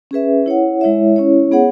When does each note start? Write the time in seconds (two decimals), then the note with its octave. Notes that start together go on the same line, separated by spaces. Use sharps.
0.11 C#4 G#4 B4 E5
0.46 E4 C#5 F#5
0.81 G#3 E4 C#5 E5
1.16 C#4 E4 C#5
1.51 B3 G#4 C#5 F#5